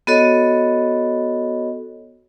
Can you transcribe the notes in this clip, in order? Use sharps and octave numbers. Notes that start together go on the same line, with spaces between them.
B3 F#4 A4 C#5 D#5